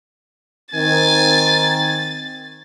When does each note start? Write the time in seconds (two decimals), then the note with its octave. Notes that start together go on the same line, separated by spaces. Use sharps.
0.74 D#3 C4 G#5 A6